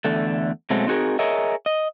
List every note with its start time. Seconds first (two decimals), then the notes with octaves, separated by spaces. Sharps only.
0.05 E2 D3 A3
0.70 B2 F#3 G#3 A3 C4
0.87 C4 D#4 F#4 G#4 A#4
1.19 G#4 A#4 C#5 D#5 E5
1.66 D#5